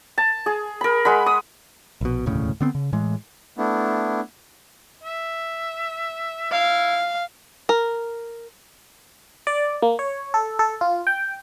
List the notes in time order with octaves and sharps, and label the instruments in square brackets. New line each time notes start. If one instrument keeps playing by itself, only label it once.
[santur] A5
G#4
A#4 B5
G#3 F#5 B5
D#6
[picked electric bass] A#1 B2
E1 D2 A2 C#3
D3 B3 C4
C#3
A2 E3 G#3
[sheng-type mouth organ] A3 B3 D4 E4
[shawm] E5
[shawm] E4 [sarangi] F5
[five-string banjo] A#4
[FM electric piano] D5
A#3
C#5
A4
A4
F4
G5